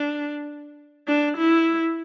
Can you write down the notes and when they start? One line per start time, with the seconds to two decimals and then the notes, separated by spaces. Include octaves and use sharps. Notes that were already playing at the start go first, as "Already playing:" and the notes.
Already playing: D4
1.08 D4
1.37 E4